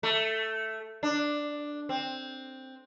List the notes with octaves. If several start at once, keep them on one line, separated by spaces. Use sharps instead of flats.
A3
D4
C4